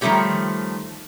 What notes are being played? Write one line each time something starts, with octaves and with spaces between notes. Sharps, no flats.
D#3 F3 G3 A3 G4 C#5